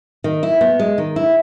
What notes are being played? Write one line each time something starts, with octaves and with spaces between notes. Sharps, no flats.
D#3
E4
B3
G#3
D#3
E4